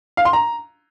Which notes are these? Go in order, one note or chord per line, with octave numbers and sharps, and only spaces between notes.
F5
C6
A#5